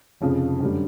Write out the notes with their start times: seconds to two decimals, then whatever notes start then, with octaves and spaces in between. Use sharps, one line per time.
0.21 F1 F2 C#3 F3
0.60 F#2 D3 G3